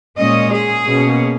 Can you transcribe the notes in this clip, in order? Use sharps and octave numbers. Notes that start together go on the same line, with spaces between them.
A#2 G#3 C#4 D#5
G#4
B2 A#3 C#4